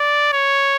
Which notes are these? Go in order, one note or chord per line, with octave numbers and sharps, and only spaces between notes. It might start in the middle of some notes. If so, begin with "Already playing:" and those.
Already playing: D5
C#5